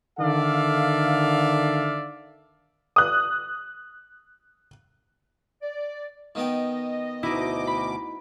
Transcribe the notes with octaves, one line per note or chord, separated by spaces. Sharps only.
D3 D#3 A4 D5 E5 F5
D#6 F#6
D5
D#3 B3 D#5 G5
D2 B2 D#4 E4 D6
B5